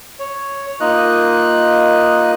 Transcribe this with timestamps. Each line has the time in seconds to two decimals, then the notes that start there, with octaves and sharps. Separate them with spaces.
0.19 C#5
0.80 A#3 D#4 F4 D#5 F#6